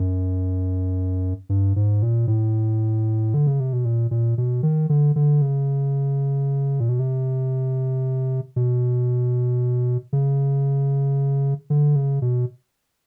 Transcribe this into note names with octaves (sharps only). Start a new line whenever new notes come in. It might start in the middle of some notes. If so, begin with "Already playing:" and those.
Already playing: F#2
G2
G#2
A#2
A2
D3
C#3
C3
B2
A#2
A#2
B2
D#3
D3
D3
C#3
A#2
B2
C3
B2
C#3
D3
C#3
B2